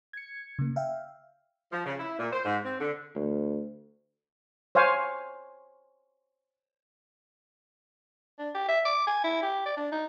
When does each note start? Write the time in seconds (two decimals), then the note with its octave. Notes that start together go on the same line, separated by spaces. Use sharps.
0.13 G#6 C#7
0.59 C#3 A#3
0.76 E5 F5 G5
1.71 F3
1.86 C#3
1.99 E4
2.19 A#2
2.32 C5
2.45 G#2
2.64 C4
2.80 D3
3.15 D2
4.75 C5 C#5 F5 G#5
8.39 D4
8.55 G4
8.68 E5
8.85 D6
9.07 G#5
9.24 E4
9.42 G4
9.65 D5
9.77 D4
9.92 D#4